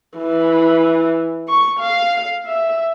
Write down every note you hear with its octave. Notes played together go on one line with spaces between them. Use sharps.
E3
C#6
F5
E5